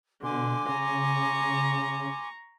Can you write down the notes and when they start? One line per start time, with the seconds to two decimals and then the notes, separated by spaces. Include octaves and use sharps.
0.23 B2 D3 G#5 C6 D6
0.69 C#3 A#5 C#6